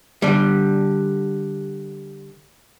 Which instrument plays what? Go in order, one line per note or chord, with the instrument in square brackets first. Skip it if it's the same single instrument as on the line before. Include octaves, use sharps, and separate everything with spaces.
[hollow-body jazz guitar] D3 G3